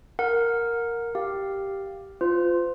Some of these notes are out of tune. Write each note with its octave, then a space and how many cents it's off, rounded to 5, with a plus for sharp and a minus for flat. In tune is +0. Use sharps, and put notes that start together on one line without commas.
A#4 +0 F#5 -30
G4 +0 F5 +0
F4 +0 C5 -40